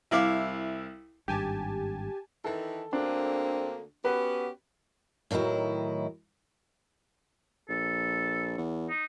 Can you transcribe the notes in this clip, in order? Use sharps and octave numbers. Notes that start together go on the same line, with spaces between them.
C2 E4 F5 D6 E6
G#1 G2 G4 G#5 A5
D#3 E3 A4 A5
D2 D3 A#3 C4 D4
B3 C#4 F#4 G4 B4
A2 D#3 F#3 D#4 E4
A#1 A4
E2
D#4